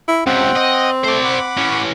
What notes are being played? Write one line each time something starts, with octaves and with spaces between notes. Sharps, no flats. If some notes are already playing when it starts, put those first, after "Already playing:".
E4
C#2 C3 C4 F#5 G5
D#5
A3 C5 D5
F#5 B5 D6
E3 C#4